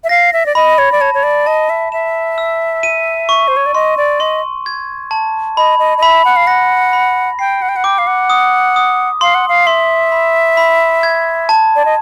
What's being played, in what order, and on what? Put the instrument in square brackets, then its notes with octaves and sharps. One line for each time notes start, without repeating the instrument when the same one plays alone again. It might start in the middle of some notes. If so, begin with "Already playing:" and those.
[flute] E5
[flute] F5 [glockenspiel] A#6
[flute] E5
D5
[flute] D#5 [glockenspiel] B5
[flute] C#5
D5
[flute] C#5 [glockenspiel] A5
[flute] C#5
D5
[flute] D#5 [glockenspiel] A5
[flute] E5
[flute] E5 [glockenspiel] E7
[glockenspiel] E6
D#7
C#6
[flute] C5
C#5
D5
[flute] D#5 [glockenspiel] C6
[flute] D5
[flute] D#5 [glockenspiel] C6
[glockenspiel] G#6
A5
[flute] D#5 [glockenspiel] B5
[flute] D#5
D#5
[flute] E5 [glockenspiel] B5
[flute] F#5
F5
[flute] F#5 [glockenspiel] A#6
[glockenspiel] B5
[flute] G5 [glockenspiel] C7
[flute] F#5
G5
F#5
[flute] G5 [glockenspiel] D6
[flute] F5
F#5
[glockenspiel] D#6
D#6
[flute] F5 [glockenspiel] C6
[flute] F#5
F5
[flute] E5 [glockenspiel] C6
[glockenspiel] B5
B5
G#6
A5
[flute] D5
D#5